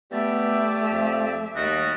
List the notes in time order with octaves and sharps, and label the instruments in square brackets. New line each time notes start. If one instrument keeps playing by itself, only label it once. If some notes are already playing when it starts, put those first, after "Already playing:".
[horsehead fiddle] A3 E5 [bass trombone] B3 [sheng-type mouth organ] G4 D5
[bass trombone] F2
[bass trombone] D#2 [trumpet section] G3 F#4 [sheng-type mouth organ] D#5